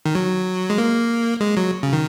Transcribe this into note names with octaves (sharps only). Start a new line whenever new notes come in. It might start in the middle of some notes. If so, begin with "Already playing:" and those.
D#3
F#3
G#3
A#3
G#3
F#3
C#3
D#3